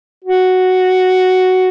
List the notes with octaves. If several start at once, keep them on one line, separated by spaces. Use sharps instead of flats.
F#4